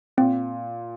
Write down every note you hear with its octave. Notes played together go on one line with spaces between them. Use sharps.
A#2 C4